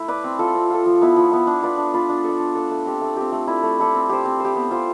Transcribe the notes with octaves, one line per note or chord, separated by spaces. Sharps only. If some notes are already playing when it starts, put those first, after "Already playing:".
Already playing: A3 E4
B4 D5
C4
F4 A4
C4
F4 A4
F3
B3 E4
F3
B3 E4
D4
F4 B4 D5
D4
F4 B4 D5
D4
A4 D5
D4
A4 D5
A3
C4 G4
A3
C4 G4
A3
E4 A4 D5
A3
E4 A4 D5
C4
G4 C5
C4
G4 C5
B3
F4 C5